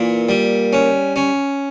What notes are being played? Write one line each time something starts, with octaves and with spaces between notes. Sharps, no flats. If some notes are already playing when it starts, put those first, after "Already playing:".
Already playing: A#2 E3
G3
C#4
C#4